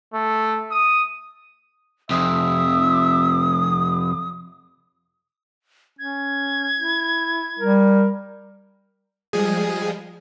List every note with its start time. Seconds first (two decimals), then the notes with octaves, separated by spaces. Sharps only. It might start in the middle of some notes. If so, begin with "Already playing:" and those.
0.14 A3
0.71 D#6
2.10 F2 C3 E5 D#6
5.99 C#4 G#6
6.79 E4
7.59 G3 A#4
9.33 F3 G3 G#3 G#4